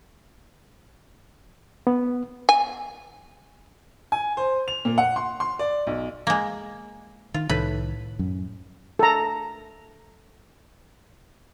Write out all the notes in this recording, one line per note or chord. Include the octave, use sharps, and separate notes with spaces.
B3
G#5
G#5
C5
F7
A#2
F#5
C6
C6
D5
B1
G#3 A#3
D#3 F4
C2 A2 D#3 B4
F#2
A4 A#5